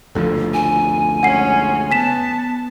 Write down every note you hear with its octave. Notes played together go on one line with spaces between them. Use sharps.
F#1 D2 F3 A4
G#5
G#3 C#4 F#5 C7
B3 G#5 A5 B6 E7